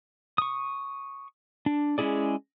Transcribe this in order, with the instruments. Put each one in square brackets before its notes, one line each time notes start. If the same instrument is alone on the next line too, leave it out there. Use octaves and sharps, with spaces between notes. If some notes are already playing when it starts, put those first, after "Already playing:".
[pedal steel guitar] C#6 D#6
D4
G#3 C#4 E4 G#4 D5